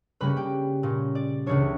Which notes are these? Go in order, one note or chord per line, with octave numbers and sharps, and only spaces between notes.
C#3 G3 A#3 C#4 B4 B5
G4 G5
A#2 A#3 C#4
D5
C#2 C#3 E3 A#3 D4 C#5